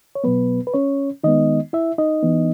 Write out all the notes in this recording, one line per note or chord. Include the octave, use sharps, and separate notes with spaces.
C#5
B2 F#3 B3 B4
B4
C#4 C#5
D#3 G#3 B3 D#4 D#5
E4 E5
D#4 D#5
E3 B3